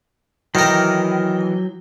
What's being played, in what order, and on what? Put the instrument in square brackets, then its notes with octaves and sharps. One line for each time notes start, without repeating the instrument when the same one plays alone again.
[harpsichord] D#3 A#4 [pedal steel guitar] E3 [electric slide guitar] F#3 G5